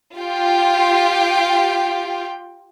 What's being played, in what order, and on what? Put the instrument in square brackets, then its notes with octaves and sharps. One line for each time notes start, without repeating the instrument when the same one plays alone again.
[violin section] F4 G4 G5